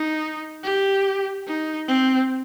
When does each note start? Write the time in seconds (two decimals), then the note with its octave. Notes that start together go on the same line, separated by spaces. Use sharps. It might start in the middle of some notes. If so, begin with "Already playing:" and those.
Already playing: D#4
0.64 G4
1.47 D#4
1.89 C4